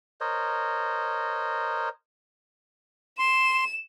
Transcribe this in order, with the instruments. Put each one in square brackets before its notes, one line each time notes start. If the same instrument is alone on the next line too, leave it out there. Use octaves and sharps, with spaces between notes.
[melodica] A#4 C5 C#5 D#5
[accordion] C6 [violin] E7